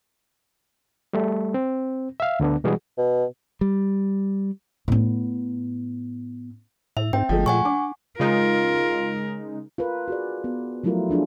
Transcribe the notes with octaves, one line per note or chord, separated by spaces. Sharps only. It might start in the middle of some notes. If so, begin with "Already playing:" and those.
G3 A3
C4
E5 F5
D2 D3 B3 D4
B2 E3 G3 G#3 F#4 G#4
B2
G3
A2 B3
A2 E5 F7
G#2 C4 G5
G1 F3 G#3 A3
A#2 F#5 G#5 C#6
D4 D6
C#3 G#3 D#4 F4 A#4
F4 A#4 B4
F#4 G#4 D5
B3
F3 F#3 A3 E4 F4 A#4
F3 D4 F4 G#4